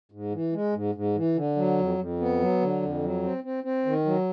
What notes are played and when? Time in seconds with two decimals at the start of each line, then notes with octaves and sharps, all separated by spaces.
0.12 G#2
0.33 E3
0.53 G#3
0.73 G#2
0.95 G#2
1.16 E3
1.36 D3
1.56 F#3
1.78 F2
1.98 F2
2.20 B3
2.40 F#3
2.61 D3
2.82 F2
3.03 F#3
3.23 C4
3.44 C4
3.64 C4
3.86 D#3
4.05 F#3